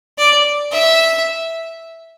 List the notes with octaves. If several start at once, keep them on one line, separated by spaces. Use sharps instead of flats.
D5
E5